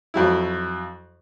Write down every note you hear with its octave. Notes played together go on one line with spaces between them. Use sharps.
F2 F#3 E4